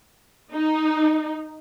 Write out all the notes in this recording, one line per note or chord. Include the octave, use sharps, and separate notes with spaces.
D#4